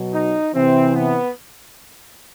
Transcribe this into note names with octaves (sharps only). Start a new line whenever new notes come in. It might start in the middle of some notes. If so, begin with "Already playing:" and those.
Already playing: B2 F#3
D#4
C3 E3 C4
B3